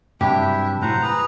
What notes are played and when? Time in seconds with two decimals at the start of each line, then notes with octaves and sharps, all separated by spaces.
0.21 G2 C3 F#3 D4 E4 G4 E5
0.82 A2 F#3 E4 C5 F#5 A#5
1.02 G#4 B4 A#5